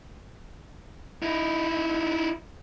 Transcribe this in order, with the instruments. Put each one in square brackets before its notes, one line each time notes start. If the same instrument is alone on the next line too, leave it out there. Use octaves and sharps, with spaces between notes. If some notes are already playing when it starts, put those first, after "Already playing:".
[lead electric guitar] D#4 E4